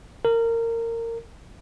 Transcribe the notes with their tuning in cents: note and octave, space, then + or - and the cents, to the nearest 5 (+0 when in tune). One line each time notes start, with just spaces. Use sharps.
A#4 -20